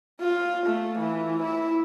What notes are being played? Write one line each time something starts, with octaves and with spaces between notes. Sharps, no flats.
F4
A3
E3
E4